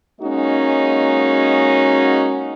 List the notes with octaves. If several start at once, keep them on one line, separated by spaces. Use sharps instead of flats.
G#3 A#3 C#4 D#4 F#4 D#5